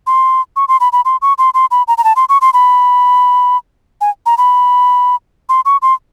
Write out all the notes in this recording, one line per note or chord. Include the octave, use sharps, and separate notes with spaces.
C6
C#6
C6
B5
B5
C6
C#6
C6
C6
B5
A#5
A#5
A5
C6
C#6
C6
B5
G#5
A#5
B5
C6
C#6
C6